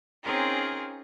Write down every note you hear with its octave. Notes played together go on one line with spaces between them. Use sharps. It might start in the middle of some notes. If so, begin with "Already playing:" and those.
C4 C#4 D#4 F4 G#4 A#4